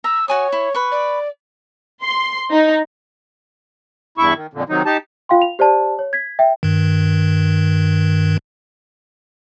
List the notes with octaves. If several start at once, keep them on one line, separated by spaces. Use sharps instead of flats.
A#5 E6
F#4 C#5 G#5 D#6
E4
B4 C#6
D5
C6
D#4
E2 G2 E4 E5 C#6
D#3
F2 A#2 D3
C3 D#3 F#3 D#4
D#4 G4 A5
F4 F5 G5 C6
F7
G4 C5 D5 A5
C#5
G#6 B6
E5 G5
G2 D#3